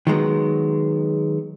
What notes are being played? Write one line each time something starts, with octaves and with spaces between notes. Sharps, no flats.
D#3 F#3 G#3 B3